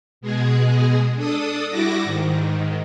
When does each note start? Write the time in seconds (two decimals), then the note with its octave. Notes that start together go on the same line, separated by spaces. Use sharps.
0.21 B2 G#3 G#4
1.15 D4 A4 D#6
1.68 G3 E4 F#4 D6 A#6
2.03 G#2 D#3